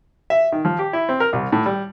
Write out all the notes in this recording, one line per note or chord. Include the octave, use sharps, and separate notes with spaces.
E5
D#3
F3
G4
E4
C4
A#4
C2
A2
G3